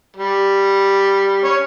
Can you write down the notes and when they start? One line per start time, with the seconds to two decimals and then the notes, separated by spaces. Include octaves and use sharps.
0.17 G3
1.44 C#4